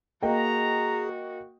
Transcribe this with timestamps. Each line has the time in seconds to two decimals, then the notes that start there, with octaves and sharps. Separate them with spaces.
0.23 A#3 F#4 G#4 D#5 G5 A#5